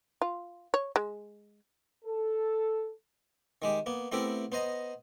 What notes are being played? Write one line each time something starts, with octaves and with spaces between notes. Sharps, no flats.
F4
C#5
G#3
A4
D#3 G#3 G4
A#3 B3
A3 B3 C4 E4 G4 A#4
B3 C5 D#5 A#5